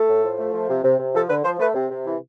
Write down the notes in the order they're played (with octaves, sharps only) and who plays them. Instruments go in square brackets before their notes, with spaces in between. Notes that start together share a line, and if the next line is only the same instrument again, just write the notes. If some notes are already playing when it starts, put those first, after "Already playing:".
Already playing: [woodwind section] A3 A4
A2
F3
A3
F3
C3
C3
C3
F3 A4
D3 B4
F3 C5
A3 B4
C3
C3
E3